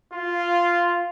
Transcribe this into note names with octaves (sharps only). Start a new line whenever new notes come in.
F4